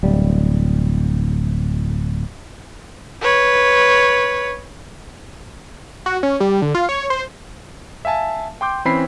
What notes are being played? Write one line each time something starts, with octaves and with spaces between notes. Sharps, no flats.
D1 G3
B4 C#5
F#4
C#4
G3
D3
F4
C#5
C5
E5 F5 G#5 A5
G5 C6 D6 G6
E3 C4 C#4 B5 B6 C7